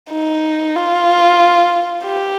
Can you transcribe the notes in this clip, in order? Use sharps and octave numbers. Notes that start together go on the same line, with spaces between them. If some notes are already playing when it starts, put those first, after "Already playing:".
D#4
F4
G4